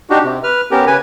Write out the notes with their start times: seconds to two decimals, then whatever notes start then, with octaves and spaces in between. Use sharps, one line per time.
0.10 D4 D#4 F#4 G4
0.24 C3
0.43 B4 F6
0.71 B3 C#4 G4 A#4
0.87 C#3 B4 G#5